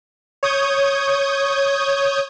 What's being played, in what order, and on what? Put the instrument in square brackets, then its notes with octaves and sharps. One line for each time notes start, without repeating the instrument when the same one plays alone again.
[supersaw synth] C#5 D#6 G6 G#6